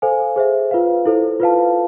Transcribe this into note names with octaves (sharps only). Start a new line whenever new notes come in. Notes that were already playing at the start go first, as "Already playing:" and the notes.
A4 C5 F5 G#5
G#4 C5 E5
F4 B4 F5
E4 A4 C5
F4 B4 F5 A5